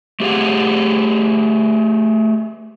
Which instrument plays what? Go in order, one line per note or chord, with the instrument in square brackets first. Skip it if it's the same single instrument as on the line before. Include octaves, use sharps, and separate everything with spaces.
[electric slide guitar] A3 G4 G#4 F5 F#5